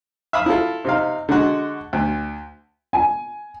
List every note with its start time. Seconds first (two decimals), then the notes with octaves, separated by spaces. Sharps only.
0.33 E5 F5 B5 D#6
0.46 E4 F4 A4
0.85 C3 D#4 F5
1.29 D3 G#3 F#4
1.93 D2
2.93 G#5